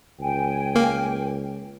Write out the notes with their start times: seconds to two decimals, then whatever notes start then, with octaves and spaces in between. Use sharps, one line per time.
0.20 C#2 G5 G#5
0.75 A#3